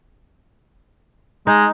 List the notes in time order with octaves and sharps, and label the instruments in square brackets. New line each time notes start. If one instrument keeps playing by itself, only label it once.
[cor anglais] G#3 [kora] D#4